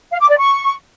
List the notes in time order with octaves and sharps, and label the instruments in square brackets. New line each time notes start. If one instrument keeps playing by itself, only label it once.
[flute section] F5
D6
D5
C#6